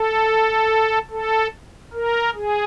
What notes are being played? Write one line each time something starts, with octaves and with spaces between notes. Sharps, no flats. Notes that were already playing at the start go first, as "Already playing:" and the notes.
Already playing: A4
A4
A#4
G#4